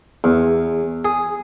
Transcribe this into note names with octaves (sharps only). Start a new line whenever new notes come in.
E2
G#4